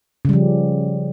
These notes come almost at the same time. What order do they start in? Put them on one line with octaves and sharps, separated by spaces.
C#3 G3 F3